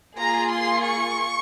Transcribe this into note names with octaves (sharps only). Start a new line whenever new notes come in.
A#3 F4 G#4 A#5
C6
C#6